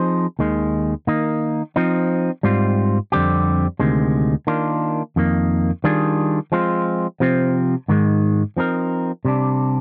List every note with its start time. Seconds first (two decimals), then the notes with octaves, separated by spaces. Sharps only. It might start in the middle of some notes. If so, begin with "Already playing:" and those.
Already playing: F3 C4 D#4 G#4 C5
0.39 D#2 D#3 G#3
1.07 D#3 A#3 D#4
1.76 F3 C4 D#4
2.43 G#2 G3 C4 F4
3.12 F2 D3 G3 C4 G4
3.79 D2 C3 D#3 G#3
4.47 D#3 A#3 D4 F4
5.16 F2 D#3 A#3
5.84 D#3 G3 D4 F4 G#4
6.52 F3 G#3 C4 F4
7.20 C3 F3 C4
7.88 G#2 D#3 G#3
8.57 F3 C4 D#4 A#4
9.25 C3 G3 D4